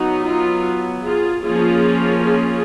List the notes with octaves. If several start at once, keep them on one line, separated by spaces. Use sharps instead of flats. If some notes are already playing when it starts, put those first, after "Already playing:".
Already playing: F#3 B3 D#4 F#4
F4
F4 G#4
F3 A#3 C#4 F4 G#4
F4 G#4